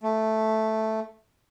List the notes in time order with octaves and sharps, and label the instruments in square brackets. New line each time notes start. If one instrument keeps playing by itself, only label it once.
[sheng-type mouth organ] A3